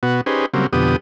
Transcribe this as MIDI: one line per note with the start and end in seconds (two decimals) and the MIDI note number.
0.03 0.21 47
0.03 0.21 59
0.03 0.21 66
0.26 0.46 61
0.26 0.46 63
0.26 0.46 67
0.26 0.46 68
0.26 0.46 71
0.26 0.46 72
0.54 0.67 49
0.54 0.67 54
0.54 0.67 55
0.54 0.67 58
0.54 0.67 60
0.73 0.96 41
0.73 0.96 47
0.73 0.96 50
0.73 0.96 59
0.73 0.96 67
0.73 0.96 87